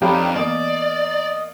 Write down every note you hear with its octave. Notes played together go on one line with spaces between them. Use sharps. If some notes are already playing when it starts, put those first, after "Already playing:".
F2 D4 D#4 G4 A4 C#5 F5 B5
E3 A#3 B3 D5 D#5